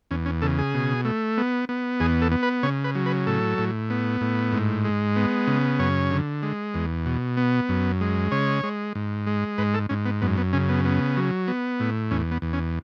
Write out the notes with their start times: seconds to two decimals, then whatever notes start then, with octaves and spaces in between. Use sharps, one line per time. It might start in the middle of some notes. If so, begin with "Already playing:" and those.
0.11 E2 C#4
0.26 C#4
0.42 C#3 A4
0.59 G#4
0.74 B2
1.05 A3
1.37 B3
1.69 B3
2.00 E2 G#4
2.22 A4
2.31 B3
2.43 B4
2.63 C#3 C#5
2.84 B4
2.95 F#3
3.06 B4
3.27 A2 A4
3.58 A2
3.90 B3
4.21 A2
4.52 G#2
4.85 G#3
5.16 B3
5.47 C#3
5.79 F#2 C#5
6.11 D3
6.43 G#3
6.74 E2
7.06 B2
7.37 B3
7.69 F#2
8.01 G#3
8.31 C#3 C#5
8.63 G#3
8.95 G#2
9.27 G#3
9.58 G#2 B4
9.74 A4
9.89 G#2 C#4
10.06 B3
10.22 F#2 B3
10.37 B3
10.53 C#3 C#4
10.69 B3
10.85 B3
11.17 F#3
11.48 B3
11.80 A2
12.11 E2 C#4
12.31 B3
12.42 E2
12.53 C#4